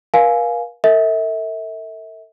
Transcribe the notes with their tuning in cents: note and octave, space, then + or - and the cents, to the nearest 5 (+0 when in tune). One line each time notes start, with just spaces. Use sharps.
A#4 +45 F5 +5 G#5 +10
A4 +45 E5 -35